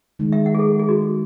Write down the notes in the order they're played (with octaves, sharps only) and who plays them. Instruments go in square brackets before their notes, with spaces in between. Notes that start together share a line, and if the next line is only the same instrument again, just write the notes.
[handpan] D#3 G#3 D#4
[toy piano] E5
F#5
G#4
A4
G#4
F#4